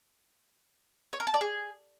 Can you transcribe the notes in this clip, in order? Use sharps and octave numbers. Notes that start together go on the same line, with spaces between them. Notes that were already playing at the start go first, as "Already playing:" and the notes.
C#5
A#4
A5
D5
G#4